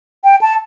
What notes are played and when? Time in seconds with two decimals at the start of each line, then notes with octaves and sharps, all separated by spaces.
0.24 G5
0.41 A5